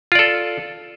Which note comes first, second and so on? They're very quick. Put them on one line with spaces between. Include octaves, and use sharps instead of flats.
F4 D5 A4